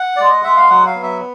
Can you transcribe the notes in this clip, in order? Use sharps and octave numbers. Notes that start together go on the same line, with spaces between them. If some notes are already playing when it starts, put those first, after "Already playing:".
Already playing: F#5
G#3 D5
D#5
G#3 E5
F5
F#3 F#5
F5
B3
E5